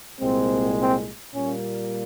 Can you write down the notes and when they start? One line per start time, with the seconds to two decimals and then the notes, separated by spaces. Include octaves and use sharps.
0.21 C2 A#2 G#3 C4
0.78 C4
1.35 A#2 G3 A#3 C#4